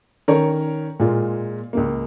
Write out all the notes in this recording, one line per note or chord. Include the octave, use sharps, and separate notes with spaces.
D#3 C#4 A#4 C#5
A#2 G#3 F4
C#2 C#3 A#3